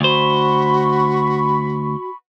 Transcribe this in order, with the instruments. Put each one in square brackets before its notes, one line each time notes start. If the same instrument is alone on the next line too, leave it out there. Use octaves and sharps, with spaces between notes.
[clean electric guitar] D2 C5 [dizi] F#4 [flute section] B5 C#6